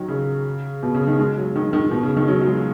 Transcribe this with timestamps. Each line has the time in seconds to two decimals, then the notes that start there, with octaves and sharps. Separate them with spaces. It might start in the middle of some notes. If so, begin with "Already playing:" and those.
Already playing: D#3 F#3
0.08 C#3
0.83 B2
0.95 C#3
1.07 D#3
1.18 G#3
1.37 F#3
1.56 D#3
1.73 D#3
1.91 B2
2.03 C#3
2.17 D#3
2.28 F#3
2.41 F#3
2.46 G#3